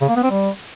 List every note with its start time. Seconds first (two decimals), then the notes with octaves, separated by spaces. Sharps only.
0.01 C#3
0.09 A#3
0.16 B3
0.23 C4
0.31 G3